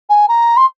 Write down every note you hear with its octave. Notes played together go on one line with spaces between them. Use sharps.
G#5
A#5
C6